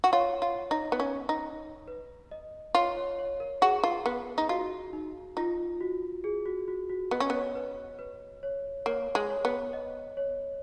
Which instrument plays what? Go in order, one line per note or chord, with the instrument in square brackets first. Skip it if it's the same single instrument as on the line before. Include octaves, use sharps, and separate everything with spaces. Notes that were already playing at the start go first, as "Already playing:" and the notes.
[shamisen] F#4
[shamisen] F4 [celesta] C#5
[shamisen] F4
D#4
B3
C#4
D#4
[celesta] B4
D#5
[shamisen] F4 [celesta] C#5
[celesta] C#5
C#5
A#4
[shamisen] F#4 [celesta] G#4
[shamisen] F4
B3
D#4
[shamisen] F4 [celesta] F#4
[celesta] D#4
[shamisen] D#4 [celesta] F4
[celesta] F#4
G#4
F#4
F#4
F#4
[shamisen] B3 [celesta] D#5
[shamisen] C#4
[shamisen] B3 [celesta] C#5
[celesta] B4
B4
C#5
[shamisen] A#3 [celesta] C#5
[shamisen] G#3
[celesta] C#5
[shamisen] B3
[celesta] D#5
C#5